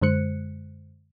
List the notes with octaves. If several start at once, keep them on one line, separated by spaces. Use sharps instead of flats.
F#2 D3 G#3 C5 F#6 C#7